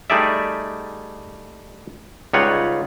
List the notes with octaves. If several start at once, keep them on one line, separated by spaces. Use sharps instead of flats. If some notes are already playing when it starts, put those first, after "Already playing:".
G3 A3 D#4 G#4 D5 E5
C#2 G3 D#4 F4 C#5 F#5